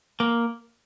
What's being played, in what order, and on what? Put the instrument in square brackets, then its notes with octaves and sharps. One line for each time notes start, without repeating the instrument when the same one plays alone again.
[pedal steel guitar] A#3